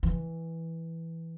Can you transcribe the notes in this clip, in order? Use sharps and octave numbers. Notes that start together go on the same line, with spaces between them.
E3